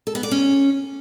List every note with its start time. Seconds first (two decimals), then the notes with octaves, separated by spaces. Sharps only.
0.07 A4
0.15 B3
0.23 D5
0.31 C#4